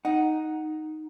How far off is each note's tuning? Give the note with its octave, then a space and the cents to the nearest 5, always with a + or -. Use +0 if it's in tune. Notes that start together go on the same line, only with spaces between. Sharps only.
D#4 +0 F#5 +0